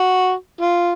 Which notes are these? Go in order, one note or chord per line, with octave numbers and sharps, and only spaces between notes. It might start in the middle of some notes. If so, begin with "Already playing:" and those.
Already playing: F#4
F4